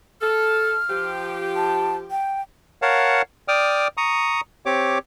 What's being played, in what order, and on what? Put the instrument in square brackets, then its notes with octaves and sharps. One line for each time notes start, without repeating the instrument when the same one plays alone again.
[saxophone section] A4 [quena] F6
[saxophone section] F3 G4
[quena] A5
G5
[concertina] A#4 C#5 F5 F#5 A5
D5 G5 D6 D#6 F6
A#5 C#6 D#6
C4 G4 C#5 D6